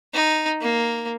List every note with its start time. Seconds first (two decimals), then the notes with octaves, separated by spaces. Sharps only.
0.14 D#4
0.61 A#3